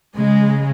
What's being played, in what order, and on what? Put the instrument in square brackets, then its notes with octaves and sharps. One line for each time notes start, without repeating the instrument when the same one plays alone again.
[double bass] C#3 [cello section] G#3